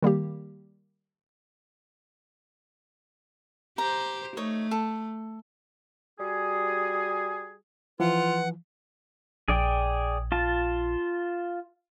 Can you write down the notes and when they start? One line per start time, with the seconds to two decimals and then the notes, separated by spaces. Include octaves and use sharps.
0.03 D#3 G3 A#3 G4
3.78 G4 C5 A#5
4.37 A3 D#4 C#5
4.71 A4
6.20 G3 F#4 G#4
8.00 E3 F3 F4 B4 F#5
9.48 A#1 G#4 D5 G5
10.32 F4 A5